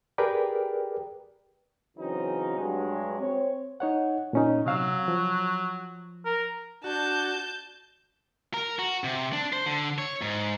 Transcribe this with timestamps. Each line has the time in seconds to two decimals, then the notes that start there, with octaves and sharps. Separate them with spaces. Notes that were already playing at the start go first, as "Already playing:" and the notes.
0.18 G4 G#4 A#4 B4 D5 G5
1.97 C#3 E3 F#3 C4 C#4 D#4
2.57 G2 F#3 G#3
3.19 C4 C#5
3.80 D#4 C#5 F#5
4.33 A#2 C#4 D#4
4.66 C3 F#3 F5 E6
5.08 F3
6.25 A#4
6.84 D4 F#4 A5 G6
8.54 A#4
8.79 F#4
9.04 C3
9.33 D4
9.53 C5
9.66 D3
9.99 C#5
10.22 G#2